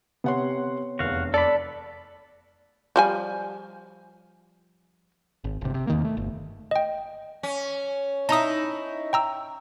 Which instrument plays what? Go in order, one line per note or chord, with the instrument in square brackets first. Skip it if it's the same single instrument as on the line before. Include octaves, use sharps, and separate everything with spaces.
[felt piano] C3 F#5 C6 [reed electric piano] B3 C#5
[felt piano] F1 E2 [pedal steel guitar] F#4 F5
[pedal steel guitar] A4 B5 [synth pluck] D5
[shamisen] F3 G3 G#5
[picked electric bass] G#1
G1 C3
C3
E2 D#3 A#3
A3
G1
[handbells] D#5 G5
[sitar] C#4
[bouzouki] D#4 E4 [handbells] A5 A#5 D#6
[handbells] G5 A#5 E6